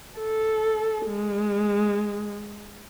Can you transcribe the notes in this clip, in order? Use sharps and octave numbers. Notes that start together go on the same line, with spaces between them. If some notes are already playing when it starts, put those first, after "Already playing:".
A4
G#3